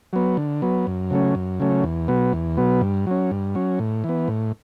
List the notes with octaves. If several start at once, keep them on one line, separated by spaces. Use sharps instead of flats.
F#3 B3
D3
F#3 B3
F#2
C#3 F#3 A3 C#4
F#2
C#3 F#3 A3 C#4
E2
B2 F#3 B3
E2
B2 F#3 B3
G2
F#3 C#4
G2
F#3 C#4
A2
E3
B3
A2